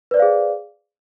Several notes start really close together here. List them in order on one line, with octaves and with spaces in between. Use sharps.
B4 D5 C5 F5 G#4